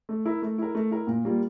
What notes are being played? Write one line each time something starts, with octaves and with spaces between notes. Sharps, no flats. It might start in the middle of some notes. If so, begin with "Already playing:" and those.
A3
E4 A#4
A3
E4 A#4
A3
E4 A#4
A#2
G3 A#3 F4